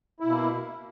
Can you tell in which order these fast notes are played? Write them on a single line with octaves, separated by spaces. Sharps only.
E4 B2 A#3